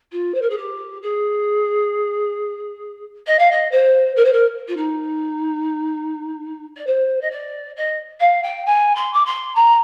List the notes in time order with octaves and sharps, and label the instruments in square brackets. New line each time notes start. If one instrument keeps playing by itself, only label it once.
[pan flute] F4
C5
A#4
G#4
G4
G#4
D#5
F5
D#5
C5
A#4
C5
A#4
F4
D#4
D5
C5
D#5
D5
D#5
F5
G5
G#5
C6
D6
C6
A#5